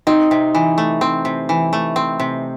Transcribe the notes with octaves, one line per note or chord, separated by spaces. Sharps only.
C4 D#4
C3
E3
A3
C4
C3
E3
A3
C4
C3